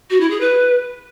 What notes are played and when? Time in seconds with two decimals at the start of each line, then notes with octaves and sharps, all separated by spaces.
0.10 F#4
0.20 E4
0.30 G#4
0.40 B4